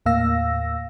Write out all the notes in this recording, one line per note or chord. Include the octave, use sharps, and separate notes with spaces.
D#2 A2 A#3 F5 E6 A#6